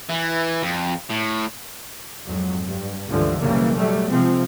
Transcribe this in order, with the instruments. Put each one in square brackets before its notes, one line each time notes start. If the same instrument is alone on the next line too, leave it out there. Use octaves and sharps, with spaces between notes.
[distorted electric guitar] E3
F2
A2
[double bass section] F2 G#2 F#3
G2
C#2 G2 D3 E3 F3
F#1 B1 C#3 E3 G3 A#3
B2 F#3 G3 A3
C3 F3 G#3 C4